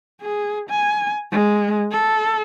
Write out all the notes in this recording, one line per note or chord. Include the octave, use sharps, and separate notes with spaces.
G#4
G#5
G#3
A4